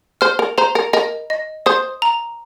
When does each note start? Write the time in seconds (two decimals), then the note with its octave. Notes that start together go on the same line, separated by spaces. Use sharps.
0.21 C5 F6
0.39 A#4
0.58 C5 A#5
0.75 A#4
0.93 A#4 D#5
1.30 D#5
1.66 C5 D#6
2.02 A#5